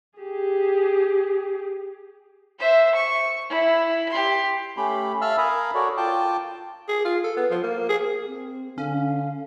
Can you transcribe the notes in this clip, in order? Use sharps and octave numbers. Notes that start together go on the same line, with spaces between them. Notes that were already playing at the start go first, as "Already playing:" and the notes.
G4 G#4
C5 E5
C#6
E4
G4 C6
A3 C#4 G4 B5
E5 F5 A5 B5 E6 F6
A#4 F5 G#5 A#5 B5 D#6
F#4 A4 A#4 C#5 D5
F4 G5 A5 D6
G#4
F4
A4
B3
F3
A#3
G#4
C4
D3 C#4 F5